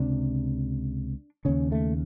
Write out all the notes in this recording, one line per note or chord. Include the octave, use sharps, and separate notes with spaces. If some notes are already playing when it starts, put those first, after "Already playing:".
Already playing: C#2 C3 D4
D#2 C#3 C#4
A3